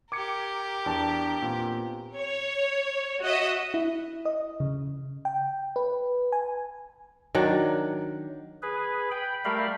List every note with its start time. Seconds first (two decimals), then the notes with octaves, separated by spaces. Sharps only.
0.12 G4 A#4 D6 G#6 C#7
0.86 E2 D4 A5
1.42 A#2 B3 C4
2.15 C#5
3.21 F#4 D#5 E5
3.74 E4
4.25 D#5
4.60 C#3
5.25 G5
5.76 B4
6.32 G#5
7.35 D#3 F#3 D4
8.62 G#4 B4
9.11 G5 B5
9.45 G3 A3 G4 A#4 F5 B5